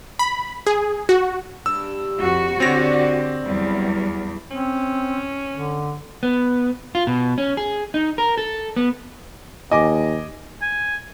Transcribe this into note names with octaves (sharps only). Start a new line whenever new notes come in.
B5
G#4
F#4
G2 E6
F2 F#4
D3 C4 G4 C#5 D5 A#6
E2 F#3 G3
C4 C#4
D3
B3
F4
B2
C#4
G#4
D#4
A#4
A4
B3
D#2 D#5 G#5 D6
G#5